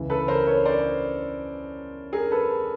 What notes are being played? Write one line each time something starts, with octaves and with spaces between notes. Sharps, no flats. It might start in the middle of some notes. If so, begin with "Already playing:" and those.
Already playing: C#2 C#3 E3
A4 B4
A#4 C5
B4 C#5
C5 D5
G#4 A#4
A4 B4